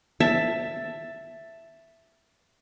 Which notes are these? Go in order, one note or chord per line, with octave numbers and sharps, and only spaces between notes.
E5 A5